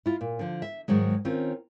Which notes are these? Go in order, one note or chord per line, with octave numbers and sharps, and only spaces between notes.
E4 F4
A#2
D3 F3
E5
G#2 D#3 F#3 G#3
D#3 C4 C#4 F4